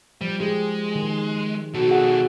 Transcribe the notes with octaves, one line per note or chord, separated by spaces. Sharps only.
F3 G3
G#3 G4 G#4
D#3
B2 F#4 A4
G#4 F#5